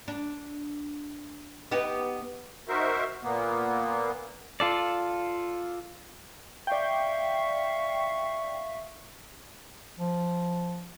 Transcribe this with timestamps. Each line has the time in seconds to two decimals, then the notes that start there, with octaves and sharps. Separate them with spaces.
0.08 D4
1.71 B3 D#4 G4
2.69 D#4 F#4 A#4 C5 E5
3.24 A#2 A#3 B3
4.60 F4 A4 D5
6.67 D5 E5 F5 G5 C#6
9.99 F3